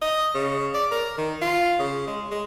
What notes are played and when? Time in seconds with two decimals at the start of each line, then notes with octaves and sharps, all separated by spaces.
0.02 D#5
0.35 C#3
0.74 D5
0.91 A#4
1.18 D#3
1.42 F4
1.79 C#3
2.07 G#3
2.31 G#3